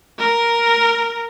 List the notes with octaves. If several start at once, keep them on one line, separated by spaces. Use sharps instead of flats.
A#4